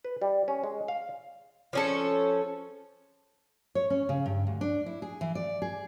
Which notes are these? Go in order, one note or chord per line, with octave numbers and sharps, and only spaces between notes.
B4
G3
C#4
G#3
F5
F3 C#4 A4
C#5
C#4
C#3
G2
D2
D4
E4
G#4
E3
D5
G#4